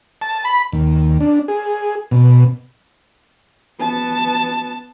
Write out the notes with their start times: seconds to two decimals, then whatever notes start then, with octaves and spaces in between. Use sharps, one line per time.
0.22 A5
0.45 B5
0.73 D#2
1.20 D4
1.48 G#4
2.11 B2
3.81 B3 A5